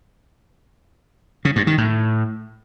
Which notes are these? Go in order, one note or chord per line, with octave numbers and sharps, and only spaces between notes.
C#3
G2
D#3
A2